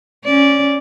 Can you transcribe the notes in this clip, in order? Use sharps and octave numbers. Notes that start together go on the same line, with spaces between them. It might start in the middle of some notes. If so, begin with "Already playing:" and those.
C#4 D5